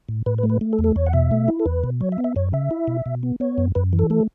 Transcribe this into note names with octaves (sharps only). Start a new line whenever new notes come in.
A2
A2 B4
B4
A3
B4
A3
A4
E2
A4
E2 C#5
F#5
B2 E5
A3
E4
A4
E2 B4
B2
F#3 C#5
E5
B3
E5
F#2 C#5
C#3 E5
E4
B2
B2
B3
B3 C#5
F#2
F#2 B4
E3
A4
A3 A4